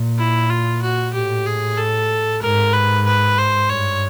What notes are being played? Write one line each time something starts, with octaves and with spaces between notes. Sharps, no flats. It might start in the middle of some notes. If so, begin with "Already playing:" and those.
Already playing: A#2
E4
F4
F#4
A2 G4
G#4
A4
G#2 A#4
B4
B4
C5
G2 C#5